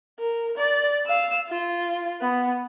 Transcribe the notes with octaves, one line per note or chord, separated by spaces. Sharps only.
A#4
D5
F5 E6
F4
B3